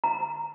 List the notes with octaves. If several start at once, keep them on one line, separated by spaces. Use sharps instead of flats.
A#5